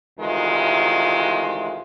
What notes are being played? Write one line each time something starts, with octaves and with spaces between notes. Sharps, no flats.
D2 C3 D#3 E3 G#3 F4